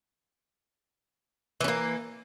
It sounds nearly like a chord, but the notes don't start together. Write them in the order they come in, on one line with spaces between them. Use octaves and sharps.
E3 C#4 A#3